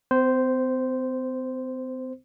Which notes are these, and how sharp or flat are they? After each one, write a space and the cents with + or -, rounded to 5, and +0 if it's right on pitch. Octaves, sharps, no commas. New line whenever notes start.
C4 -40 C5 -10